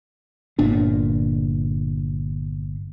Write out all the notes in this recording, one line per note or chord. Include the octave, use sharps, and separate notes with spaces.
G1 A#2 D4